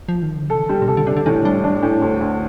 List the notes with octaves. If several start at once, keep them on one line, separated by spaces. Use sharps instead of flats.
F3
D#3
D3
C3 A4
G3
A#2
C3 A4
D3
C3 D4
D3
A2 D#3
G3 D4
D4
A2
D2
D2